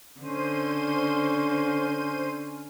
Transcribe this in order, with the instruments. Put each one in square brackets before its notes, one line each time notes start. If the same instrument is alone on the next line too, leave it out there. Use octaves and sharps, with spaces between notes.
[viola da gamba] D3 [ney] C#4 [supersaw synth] C5 C6 D#7